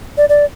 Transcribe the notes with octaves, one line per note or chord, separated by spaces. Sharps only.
D5
D5